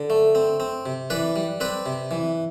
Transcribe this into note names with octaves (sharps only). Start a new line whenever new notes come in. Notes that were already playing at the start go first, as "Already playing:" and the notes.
Already playing: D3
A3
C4
C4
C3
E3 B4 D5
G3
C4 B4 D5
C3
E3